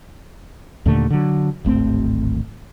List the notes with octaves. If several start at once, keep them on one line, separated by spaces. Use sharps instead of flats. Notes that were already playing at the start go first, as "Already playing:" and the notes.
D#2 A#2 D3 A3
D3 F#3
D1 G#1 A3 C4